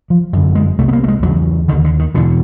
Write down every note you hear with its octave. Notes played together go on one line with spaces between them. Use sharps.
F3
F#2 D3
G#3
C2 C3 A3
B3
A#3
A3
G#3
E2 C#3 F#3
D#2 D3 D#3
D3
D#3
E2 B2 D3